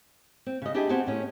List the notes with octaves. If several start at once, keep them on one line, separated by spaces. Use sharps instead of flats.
C4
C#3 D#5
D4 E4 G4 G#4 D#5
B3 C4 F#4 G#4 G#5 A5
A2 C#4